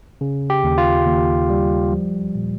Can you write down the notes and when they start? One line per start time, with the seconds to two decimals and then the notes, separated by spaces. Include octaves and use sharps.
0.21 C#3
0.50 G4
0.64 D#2
0.78 F4
1.07 D#2
1.50 G3
1.92 F3
2.35 A#2